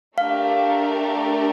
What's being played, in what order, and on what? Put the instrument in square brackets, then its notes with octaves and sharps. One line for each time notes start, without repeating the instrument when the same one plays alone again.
[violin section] A3 D4 G4 A#4 [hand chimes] F5